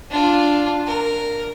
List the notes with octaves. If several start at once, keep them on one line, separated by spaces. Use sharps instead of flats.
D4 F4
A#4